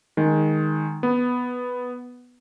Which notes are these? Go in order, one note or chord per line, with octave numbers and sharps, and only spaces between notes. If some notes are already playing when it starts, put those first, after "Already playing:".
D#3 G#3
B3